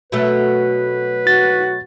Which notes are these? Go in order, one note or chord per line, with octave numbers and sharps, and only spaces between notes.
B2 F#3 A3 B4
F#4 A6